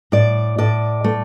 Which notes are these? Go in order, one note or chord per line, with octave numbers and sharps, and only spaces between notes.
A2 D5
A2 D5
A3